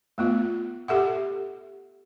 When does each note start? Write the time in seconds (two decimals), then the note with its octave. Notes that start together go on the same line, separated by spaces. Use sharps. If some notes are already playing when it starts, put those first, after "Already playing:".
0.18 A3 B3 F4
0.88 G4 A4 E5 F#5